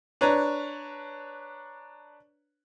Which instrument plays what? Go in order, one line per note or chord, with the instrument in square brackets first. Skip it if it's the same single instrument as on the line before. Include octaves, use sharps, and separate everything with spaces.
[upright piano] D4 B4 C#5 A#5